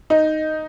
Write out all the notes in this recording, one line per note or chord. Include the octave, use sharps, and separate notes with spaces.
D#4